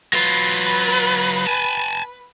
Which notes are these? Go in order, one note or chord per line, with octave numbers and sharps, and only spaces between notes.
F#3 F4 B4 B5
G#5 A5